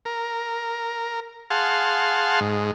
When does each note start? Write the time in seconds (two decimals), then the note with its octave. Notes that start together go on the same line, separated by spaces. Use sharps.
0.05 A#4
1.50 G#4 F5 F#5 A5 C6
2.40 G#2